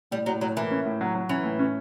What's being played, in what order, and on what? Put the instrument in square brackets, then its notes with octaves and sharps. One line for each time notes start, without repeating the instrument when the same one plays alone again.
[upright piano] A2 [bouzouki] G3
[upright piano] A2 [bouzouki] F#3
[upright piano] A2 [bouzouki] F#3
[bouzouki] E3 [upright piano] A#3
[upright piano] C#4
A2
F#3
F#3
[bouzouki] E3 [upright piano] C#4
[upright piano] A2
C#4